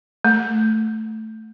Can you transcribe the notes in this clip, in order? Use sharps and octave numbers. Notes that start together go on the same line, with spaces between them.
A3